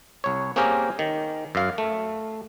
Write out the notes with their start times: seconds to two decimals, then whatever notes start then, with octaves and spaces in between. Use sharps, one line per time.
0.24 C2 C#5
0.56 A#3 C4 C#4 G4 G#4 A#4
0.99 D#3
1.55 F#2 F5
1.78 A3